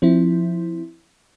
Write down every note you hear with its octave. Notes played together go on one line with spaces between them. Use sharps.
F3 C4 E4